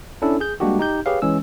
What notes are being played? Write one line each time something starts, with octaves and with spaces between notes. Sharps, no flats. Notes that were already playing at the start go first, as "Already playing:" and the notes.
C#4 D4 E4 A4
G#4 G6
G3 G#3 A#3 D4 F#4 G4
D#4 G4 G6
G4 G#4 B4 C#5 F5
E3 G#3 C#4 E6